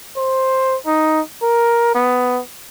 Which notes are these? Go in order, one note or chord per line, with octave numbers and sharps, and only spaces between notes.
C5
D#4
A#4
B3